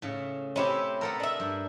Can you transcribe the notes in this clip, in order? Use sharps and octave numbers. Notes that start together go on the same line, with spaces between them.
A2 C#3
C3 C4 C#4 E4 G4
B3 A4 A#4
D4 E5
G2